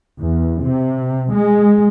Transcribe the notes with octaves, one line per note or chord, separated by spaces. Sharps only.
E2
C3
G#3